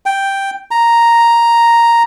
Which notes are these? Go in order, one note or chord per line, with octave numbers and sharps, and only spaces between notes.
G5
A#5